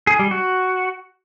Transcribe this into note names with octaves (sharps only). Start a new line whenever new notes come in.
G#4
G3
F#4